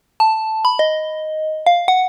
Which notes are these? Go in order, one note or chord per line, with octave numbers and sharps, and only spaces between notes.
A5
B5
D#5
F5
F#5